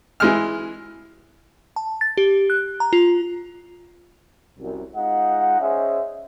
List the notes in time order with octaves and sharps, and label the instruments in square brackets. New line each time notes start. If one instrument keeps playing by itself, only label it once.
[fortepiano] E3 G#3 F6
[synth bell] A5
A6
G4
F#6
A#5
F4
[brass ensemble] C2 F#2
G#3 D#4 F4 D#5 F#5
C#4 G#4 C5 D#5 E5